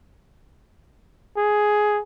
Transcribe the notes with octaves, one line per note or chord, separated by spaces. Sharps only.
G#4